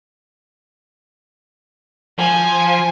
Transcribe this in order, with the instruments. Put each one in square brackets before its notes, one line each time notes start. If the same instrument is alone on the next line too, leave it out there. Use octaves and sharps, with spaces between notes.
[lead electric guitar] F3 [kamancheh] G#5